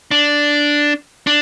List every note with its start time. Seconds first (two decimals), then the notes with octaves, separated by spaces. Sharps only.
0.11 D4
1.27 D4